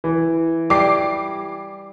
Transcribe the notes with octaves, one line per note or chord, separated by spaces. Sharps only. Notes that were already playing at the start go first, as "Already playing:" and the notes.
E3
G3 D6 C7